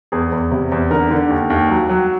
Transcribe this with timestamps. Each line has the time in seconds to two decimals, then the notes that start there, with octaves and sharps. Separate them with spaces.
0.12 E2 G#4
0.32 E2
0.52 C3
0.72 E2
0.90 D3 A#4
1.11 D3
1.30 D#2
1.50 D#2
1.70 F#3
1.89 F#3